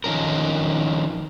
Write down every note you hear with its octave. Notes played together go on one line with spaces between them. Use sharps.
D#3 F3 C#4 A#4